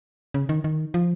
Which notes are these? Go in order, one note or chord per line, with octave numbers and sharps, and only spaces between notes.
C#3
D#3
D#3
F3